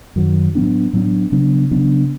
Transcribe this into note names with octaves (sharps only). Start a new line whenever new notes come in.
F#2 D#3 F#3
A2 F#3 B3 D4
A2 F#3 B3 D4
C#3 F#3 B3 D4
C#3 F#3 B3 D4